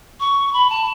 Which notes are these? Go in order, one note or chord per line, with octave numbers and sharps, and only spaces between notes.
C#6
B5
A5